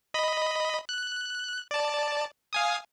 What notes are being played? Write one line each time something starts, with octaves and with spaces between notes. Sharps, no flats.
D#5 B5
F#6
D5 A5
F5 G#5 D#6